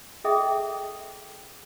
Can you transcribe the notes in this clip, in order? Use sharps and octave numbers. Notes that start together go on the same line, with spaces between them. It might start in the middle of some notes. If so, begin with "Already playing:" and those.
G#4 A4 D#5 E5 G5 D#6